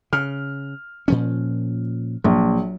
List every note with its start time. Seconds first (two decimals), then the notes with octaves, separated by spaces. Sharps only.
0.13 C#3 F6
1.08 A#2 F3 C#4
2.24 A#1 F#3